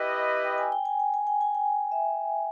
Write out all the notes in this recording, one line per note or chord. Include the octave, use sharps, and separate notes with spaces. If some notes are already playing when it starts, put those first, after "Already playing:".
Already playing: E4 G4 B4 D#5 G5
G5
G#5
G5
G#5
G5
G#5
G5
G#5
G5
E5